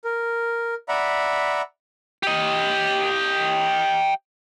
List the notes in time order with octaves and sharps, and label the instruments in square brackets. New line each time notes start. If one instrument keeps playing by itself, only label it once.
[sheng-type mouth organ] A#4
D5 E5 F#5 A#5 B5
[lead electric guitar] G4 D#5